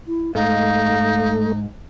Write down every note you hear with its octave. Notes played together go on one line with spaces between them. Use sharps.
E4
G#2 A3 D#4 F5